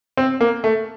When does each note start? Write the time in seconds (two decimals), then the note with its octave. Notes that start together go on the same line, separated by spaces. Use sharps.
0.17 C4
0.41 A#3
0.64 A3